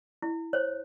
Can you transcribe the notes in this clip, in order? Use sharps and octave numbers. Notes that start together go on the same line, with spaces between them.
E4
C5 C#5